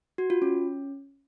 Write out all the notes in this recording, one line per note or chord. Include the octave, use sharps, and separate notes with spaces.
F#4
F4
C#4